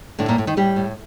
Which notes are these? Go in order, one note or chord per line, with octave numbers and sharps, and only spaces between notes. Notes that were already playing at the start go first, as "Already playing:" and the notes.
A2 D3 D4
A#2 A#3
A2
D#3 D#4
A2 G3 G4
A2